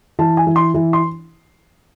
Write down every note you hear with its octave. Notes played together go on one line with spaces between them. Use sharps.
E3 A5
G#5
E3
C6
E3
C6